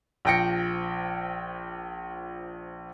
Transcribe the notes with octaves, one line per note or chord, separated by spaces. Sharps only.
A#1 F3 G5 A#6 C#7